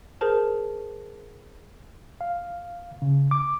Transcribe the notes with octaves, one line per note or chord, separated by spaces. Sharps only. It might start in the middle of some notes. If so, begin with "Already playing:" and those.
G#4 A#4 C5 A5
F5
C#3
D6